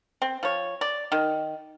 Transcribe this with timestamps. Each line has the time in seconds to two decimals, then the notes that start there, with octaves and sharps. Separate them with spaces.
0.22 C4
0.43 F3 C#5
0.81 D5
1.12 D#3